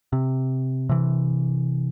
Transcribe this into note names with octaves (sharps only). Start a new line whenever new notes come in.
C3
C3 E3